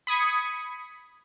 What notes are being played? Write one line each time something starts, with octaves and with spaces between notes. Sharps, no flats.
B5 D#6 G#6 C#7